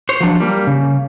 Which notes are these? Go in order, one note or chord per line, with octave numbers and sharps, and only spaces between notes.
C5 C#5
F3 F#3 D4
G3 A#3
C#3